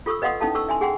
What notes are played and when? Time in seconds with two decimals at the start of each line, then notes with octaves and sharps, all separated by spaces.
0.06 F4 A4 C#6 D#6 E6
0.22 B4 D#5 F5 F#5 C6 D#6
0.40 C#4 D#4 E4 A4 F5 A5
0.55 A4 C#6 E6
0.69 E5 G#5 C6
0.81 G#4 F#5 G5 C6